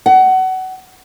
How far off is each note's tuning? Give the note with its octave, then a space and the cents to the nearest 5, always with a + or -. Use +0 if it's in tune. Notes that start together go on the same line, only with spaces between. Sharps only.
F#5 +25